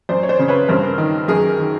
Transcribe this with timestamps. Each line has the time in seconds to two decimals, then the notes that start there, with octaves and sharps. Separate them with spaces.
0.09 F#2 C5 D5
0.23 C#5
0.29 C5 D5
0.39 C#3
0.48 B4 C#5
0.68 G2 A#4 C5
0.98 D#3
1.28 F#2 G#4 A#4
1.59 D#3